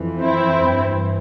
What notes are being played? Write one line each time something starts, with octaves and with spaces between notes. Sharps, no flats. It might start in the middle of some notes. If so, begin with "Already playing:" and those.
Already playing: F2 E3
C4 E4
G2 E3